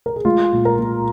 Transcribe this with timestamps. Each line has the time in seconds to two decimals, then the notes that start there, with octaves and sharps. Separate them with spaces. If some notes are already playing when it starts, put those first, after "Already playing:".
0.06 A#4
0.16 G#4
0.25 G#3 F4
0.53 A#2
0.65 A#4
0.79 A#2